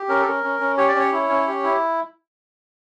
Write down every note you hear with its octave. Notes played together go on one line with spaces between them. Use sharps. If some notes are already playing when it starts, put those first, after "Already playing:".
Already playing: G4
C#4 A#4
A4
C#4 A#4
C#4
C#4
G4 C#5
D5
C#4 C#5
E4
C#4
G4
E4